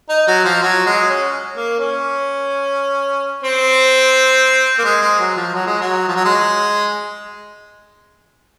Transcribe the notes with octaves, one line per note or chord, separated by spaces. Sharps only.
D#4
F#3
F3
F#3
G#3
C#4
A#3
C#4
C4
A#3
G#3
G#3
F#3
F3
F#3
G#3
F#3
F3
F#3
G#3